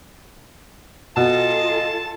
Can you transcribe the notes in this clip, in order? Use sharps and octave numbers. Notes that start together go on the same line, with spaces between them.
B2 F4 A4 D#5 A5